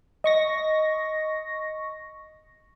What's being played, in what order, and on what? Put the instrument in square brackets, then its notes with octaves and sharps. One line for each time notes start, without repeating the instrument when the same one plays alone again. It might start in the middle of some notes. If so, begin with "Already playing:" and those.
[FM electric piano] D#5 C#6 A#6